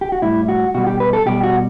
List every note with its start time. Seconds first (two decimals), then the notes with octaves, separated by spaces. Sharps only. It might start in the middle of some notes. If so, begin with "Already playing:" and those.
0.01 G4
0.12 F#4
0.22 A2 G3 E4
0.49 F#4
0.74 B2 G3 F#4
0.87 G4
1.00 B4
1.13 A4
1.26 B2 G3 G4
1.43 F#4